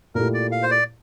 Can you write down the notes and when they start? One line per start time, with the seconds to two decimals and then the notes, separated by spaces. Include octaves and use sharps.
0.15 A#2 A3 E4 G4 A#4
0.34 D5
0.52 F5
0.63 C5
0.71 D5